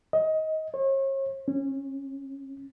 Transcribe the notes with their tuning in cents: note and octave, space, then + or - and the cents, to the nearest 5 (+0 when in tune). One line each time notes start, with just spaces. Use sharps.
D#5 +20
C#5 -40
C#4 -25